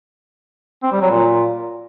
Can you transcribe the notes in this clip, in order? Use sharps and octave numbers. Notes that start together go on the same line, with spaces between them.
C4
G3
F#3
A#2